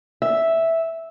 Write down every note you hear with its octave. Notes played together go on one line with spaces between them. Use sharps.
E5